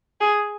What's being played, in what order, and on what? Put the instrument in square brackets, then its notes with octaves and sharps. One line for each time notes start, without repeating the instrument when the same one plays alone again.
[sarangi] G#4